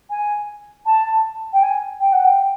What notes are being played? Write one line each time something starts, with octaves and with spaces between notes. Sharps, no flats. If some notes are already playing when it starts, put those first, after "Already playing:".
G#5
A5
G5
G#5
G5
F#5
G5